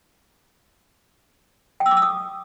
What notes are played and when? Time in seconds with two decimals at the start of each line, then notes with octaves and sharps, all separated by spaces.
1.80 G5
1.86 E6
1.91 D6
1.97 E6
2.02 D#6